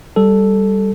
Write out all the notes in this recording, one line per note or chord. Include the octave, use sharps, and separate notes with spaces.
G3 A4